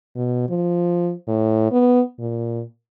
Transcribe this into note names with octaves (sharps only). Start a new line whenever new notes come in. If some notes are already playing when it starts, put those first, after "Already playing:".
B2
F3
A2
B3
A#2